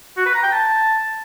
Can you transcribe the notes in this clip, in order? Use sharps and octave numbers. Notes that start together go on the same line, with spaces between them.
F#4
B4
A#5
G5
A5